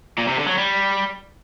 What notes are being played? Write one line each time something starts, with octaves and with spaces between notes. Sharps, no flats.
A#2
C3
D3
F#3
G3